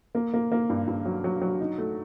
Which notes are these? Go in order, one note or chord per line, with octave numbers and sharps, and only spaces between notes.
A#3
A#3
A#3
G2
G2
F#3
F#3
F#3
D#4
A3